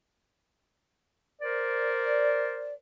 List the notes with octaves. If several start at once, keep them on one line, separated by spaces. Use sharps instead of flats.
A#4 C5 D5